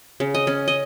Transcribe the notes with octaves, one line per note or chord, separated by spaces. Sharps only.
C#3
D#5
C#4
D#5